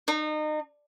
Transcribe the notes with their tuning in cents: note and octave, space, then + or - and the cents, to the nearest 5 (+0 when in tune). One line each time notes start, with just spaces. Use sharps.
D#4 -30